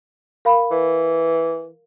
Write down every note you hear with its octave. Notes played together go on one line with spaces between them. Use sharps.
A#4 F5 B5
E3